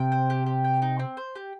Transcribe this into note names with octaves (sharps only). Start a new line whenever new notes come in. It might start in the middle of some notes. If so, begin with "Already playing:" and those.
Already playing: C3 G5
C5
G4
G4
G5
D#4
C4
C5
G4